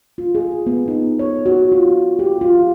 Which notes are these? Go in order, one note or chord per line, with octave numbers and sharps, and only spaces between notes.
F4
G#4
B3
D#4
C#5
F#4
F4
G4
F4